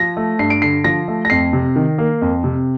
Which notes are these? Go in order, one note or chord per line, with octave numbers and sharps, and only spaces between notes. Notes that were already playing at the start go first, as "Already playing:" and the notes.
Already playing: F3 A#6
A3
G2 C7
D7
D3 C7
F3 A#6
A3
A#6
F2 C7
C3
D#3
A#3
F2
C3